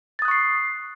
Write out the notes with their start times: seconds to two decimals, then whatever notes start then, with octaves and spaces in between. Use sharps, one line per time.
0.19 A6
0.22 D#6
0.25 F#6
0.28 C#6
0.31 C7